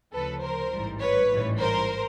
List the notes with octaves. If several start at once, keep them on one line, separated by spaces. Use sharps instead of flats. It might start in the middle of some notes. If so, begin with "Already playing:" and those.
D2 C#3 F3 A4 B4
A#4 C5
A1 G#2 E3 G3
B4 C#5
A1 G#2 E3 G3
A#4 C5